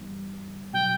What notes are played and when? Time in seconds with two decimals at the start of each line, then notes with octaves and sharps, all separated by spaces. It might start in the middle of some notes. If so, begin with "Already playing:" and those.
Already playing: G2 E3 G3 B3 D#4
0.73 B2 F#3 G5